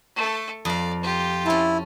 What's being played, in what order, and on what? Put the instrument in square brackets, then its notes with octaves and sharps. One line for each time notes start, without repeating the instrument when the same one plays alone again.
[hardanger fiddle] A3 A4
[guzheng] F2 F5 [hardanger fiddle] D5
[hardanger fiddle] F4 G4
[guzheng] C#4 A5 [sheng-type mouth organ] E4